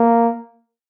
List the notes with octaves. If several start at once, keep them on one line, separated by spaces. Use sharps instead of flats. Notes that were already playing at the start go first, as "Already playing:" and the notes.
Already playing: A#3